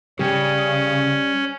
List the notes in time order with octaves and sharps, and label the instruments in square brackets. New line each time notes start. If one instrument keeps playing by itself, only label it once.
[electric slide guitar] C#3 [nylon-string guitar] G3 [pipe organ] C#4